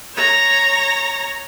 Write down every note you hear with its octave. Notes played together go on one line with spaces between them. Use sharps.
C#5 A#5